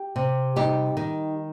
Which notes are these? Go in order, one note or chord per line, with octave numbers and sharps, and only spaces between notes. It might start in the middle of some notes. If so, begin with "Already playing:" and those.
Already playing: G4
C3
G3 D#4 G4
D#3